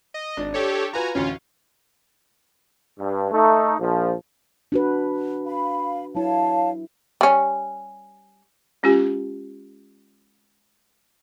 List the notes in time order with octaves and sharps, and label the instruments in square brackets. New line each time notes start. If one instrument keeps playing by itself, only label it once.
[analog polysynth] D#5
[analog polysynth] G#1 [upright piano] D4 D5
[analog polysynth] G4 A4 C#5
[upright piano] F4 B4 [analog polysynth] F#4 G#5 A#5
[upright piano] A1 D2 [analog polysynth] C#4 F4
[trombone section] G2
A3 D#4
A#1 F3
[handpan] D4 F#4 B4
[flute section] F5 B5
[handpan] F#3 E4 [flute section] C#5 F5 A5
[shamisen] G3 C#4
[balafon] G#3 C#4 F4 G4 G#5